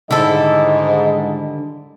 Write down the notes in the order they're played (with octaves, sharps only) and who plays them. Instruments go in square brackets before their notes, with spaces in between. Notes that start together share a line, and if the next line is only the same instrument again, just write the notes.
[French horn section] G#2 [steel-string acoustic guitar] D3 D#3 G3 [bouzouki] E4 A4 [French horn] D#5